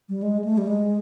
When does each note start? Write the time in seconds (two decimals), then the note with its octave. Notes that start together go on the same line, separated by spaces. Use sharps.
0.09 G3
0.22 G#3
0.44 A3
0.58 G3
0.67 G#3